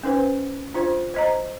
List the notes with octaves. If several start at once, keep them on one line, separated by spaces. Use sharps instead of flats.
C#4 D#4 B4 C5
D4 F4 C5
C5 D#5 A#5